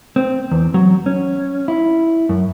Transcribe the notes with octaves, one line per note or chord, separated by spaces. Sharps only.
C4
E2
F#3
C#4
E4
F#2